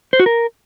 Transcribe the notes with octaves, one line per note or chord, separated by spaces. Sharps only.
C5
F#4
A#4